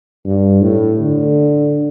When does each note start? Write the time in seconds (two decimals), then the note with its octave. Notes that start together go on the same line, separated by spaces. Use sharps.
0.25 G2
0.62 A2
1.00 D3